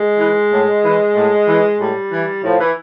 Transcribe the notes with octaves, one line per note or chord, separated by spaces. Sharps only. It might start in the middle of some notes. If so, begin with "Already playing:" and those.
Already playing: G#3
E3
A2
E3
A2
E3
A2 G3
E3
A2 F3
E3